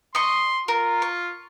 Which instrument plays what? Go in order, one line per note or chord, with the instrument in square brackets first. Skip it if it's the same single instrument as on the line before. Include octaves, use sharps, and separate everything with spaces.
[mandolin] D#5 C#6 [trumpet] C6
[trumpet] F4 [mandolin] A#4
[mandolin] C#6